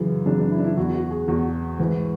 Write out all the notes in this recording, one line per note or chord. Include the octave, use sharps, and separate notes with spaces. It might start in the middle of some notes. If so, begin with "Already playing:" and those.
Already playing: F#2 C#3 E3
F#2 C#3 E3 D4
D4
E4
D4
E4
E2 B2 F#4
F#4
G#4
E2 B2 F#4
G#2 E3